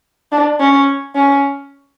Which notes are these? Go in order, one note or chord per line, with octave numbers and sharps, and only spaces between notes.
D4
C#4
C#4